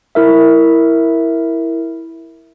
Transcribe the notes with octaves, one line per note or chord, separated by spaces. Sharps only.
E4 A#4 E5